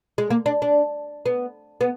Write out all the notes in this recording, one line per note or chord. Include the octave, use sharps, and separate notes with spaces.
G#3
A#3
D4
D4
B3
B3